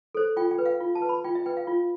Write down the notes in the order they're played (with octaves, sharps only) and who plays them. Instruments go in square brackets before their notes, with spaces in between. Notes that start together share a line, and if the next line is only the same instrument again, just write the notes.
[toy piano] A4 C5
F4 G5
G5
B4
F5
F4
A5
B4
B5
F4 G5
E5
B4 G5
F5
F4